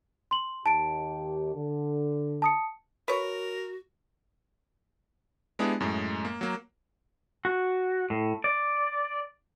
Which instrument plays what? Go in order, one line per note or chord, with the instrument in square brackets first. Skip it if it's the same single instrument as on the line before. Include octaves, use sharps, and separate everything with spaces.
[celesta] C6 F#7
[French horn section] D#2 G4 [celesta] A5 D7
[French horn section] D3
[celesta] A5 D#6 C#7
[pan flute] F#4 [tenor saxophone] A#4 [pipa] B4 C#5
[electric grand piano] G#3 B3 D4 E4 G4 G#4
F#2 A2 G#3
A#3
F#3 A#3
[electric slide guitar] F#4
A2
D5